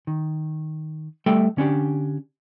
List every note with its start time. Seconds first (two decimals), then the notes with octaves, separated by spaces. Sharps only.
0.07 D#3
1.26 G3 A3 A4 E5 G5
1.57 D3 C#4 D4 G4